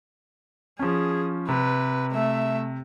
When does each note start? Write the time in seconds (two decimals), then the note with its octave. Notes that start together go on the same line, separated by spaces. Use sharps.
0.79 F3 C#4 G#4
1.48 C3 B4
2.12 A3 E5